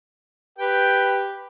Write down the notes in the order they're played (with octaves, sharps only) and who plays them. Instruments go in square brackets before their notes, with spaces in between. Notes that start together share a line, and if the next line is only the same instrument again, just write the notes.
[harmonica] G4 B4 G5